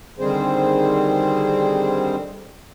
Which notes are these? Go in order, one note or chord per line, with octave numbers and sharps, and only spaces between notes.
D3 D#3 G3 C4 G#4 C5